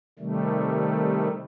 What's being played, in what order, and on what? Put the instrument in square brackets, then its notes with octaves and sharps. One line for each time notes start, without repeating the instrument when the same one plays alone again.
[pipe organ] C3 D#3 G3 A3